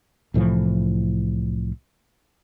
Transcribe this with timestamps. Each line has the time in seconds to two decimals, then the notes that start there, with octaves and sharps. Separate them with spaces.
0.34 C2 A2 E3 F3